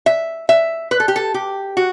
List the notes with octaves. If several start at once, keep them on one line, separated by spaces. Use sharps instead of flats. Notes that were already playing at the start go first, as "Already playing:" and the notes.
E5
E5
B4
A4
G4
A4
G4
F#4